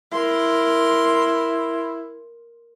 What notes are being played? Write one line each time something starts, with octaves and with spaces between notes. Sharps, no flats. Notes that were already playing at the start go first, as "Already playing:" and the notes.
E4 A#4 C6